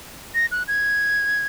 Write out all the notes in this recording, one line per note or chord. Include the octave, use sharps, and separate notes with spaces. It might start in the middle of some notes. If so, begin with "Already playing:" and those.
A#6
F#6
G#6